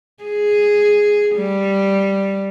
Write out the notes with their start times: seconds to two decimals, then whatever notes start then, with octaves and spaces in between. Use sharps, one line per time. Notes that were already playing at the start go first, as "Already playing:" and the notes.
0.24 G#4
1.36 G3